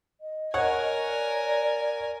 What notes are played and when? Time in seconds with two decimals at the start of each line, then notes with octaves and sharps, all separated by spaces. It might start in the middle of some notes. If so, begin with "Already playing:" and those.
0.21 D#5
0.54 A#4 C#5 F#5 G#5
1.06 D5